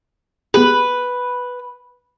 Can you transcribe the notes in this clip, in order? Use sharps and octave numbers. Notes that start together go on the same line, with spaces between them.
B3 G4 G#4 B4